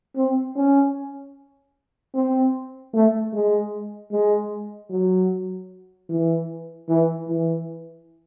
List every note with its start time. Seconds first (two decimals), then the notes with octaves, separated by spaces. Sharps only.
0.16 C4
0.56 C#4
2.14 C4
2.94 A3
3.33 G#3
4.11 G#3
4.90 F#3
6.09 E3
6.89 E3
7.28 E3